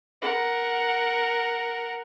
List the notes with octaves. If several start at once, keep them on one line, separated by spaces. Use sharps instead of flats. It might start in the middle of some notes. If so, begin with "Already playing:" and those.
A#4 F#5